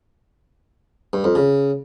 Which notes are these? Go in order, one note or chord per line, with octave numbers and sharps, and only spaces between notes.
G2
F2
C#3